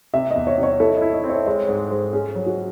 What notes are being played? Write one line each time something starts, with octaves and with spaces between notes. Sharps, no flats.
C3 E5
E2 D#5
C#5
C3
C#5
E4 A4
D#5
E4
D#5
C4
C#5
G#3 C#5
G#2 C#5
G#3 C5
C#4 G#4
F#3
F#4